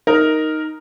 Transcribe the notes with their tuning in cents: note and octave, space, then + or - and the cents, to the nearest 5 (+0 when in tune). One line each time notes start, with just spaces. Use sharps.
D#4 +5 A#4 +0